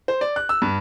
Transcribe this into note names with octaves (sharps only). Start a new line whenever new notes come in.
C5
D5
F#6
E6
G2